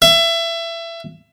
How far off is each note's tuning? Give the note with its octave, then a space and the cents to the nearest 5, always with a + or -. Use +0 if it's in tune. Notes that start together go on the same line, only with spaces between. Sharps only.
E5 +25